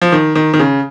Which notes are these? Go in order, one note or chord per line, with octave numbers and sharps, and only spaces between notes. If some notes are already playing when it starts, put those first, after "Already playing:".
F3
D#3
D#3
D#3
C#3